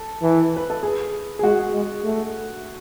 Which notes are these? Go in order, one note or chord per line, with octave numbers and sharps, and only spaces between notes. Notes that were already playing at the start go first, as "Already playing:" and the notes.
Already playing: A4
E3
B4
A4
G#4
G#4
G#3 F#4
G#3
A3